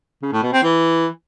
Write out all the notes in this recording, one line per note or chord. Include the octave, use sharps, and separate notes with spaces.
C#3
A2
B2
C4
E3